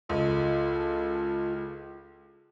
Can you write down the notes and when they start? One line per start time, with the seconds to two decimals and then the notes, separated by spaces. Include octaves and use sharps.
0.09 C#2 F4 A4